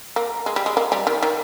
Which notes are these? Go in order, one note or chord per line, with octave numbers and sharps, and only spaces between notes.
A#3
G#3
G3
G#3
A#3
G3
D#3
D#3